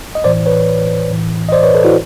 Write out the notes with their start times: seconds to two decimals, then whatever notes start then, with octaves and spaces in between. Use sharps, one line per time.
0.15 D#5
0.24 A2 E3 C5 D5
0.46 B4 C#5
1.10 A2 E3
1.49 D#5
1.52 C5 D5
1.63 B4 C#5
1.74 A4 B4
1.84 E4 F#4